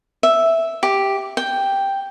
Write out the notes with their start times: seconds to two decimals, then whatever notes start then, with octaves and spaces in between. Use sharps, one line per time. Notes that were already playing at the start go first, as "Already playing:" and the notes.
0.23 E5
0.83 G4
1.37 G5